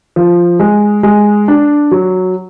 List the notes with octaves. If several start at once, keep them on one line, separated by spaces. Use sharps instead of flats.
F3
G#3
G#3
D4
F#3